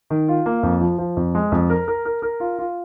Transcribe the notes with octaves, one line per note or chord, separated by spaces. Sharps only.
D#3
F4
A#3
F2
F3
F3
F2
G#3
F2
A#4
A#4
A#4
A#4
F4
F4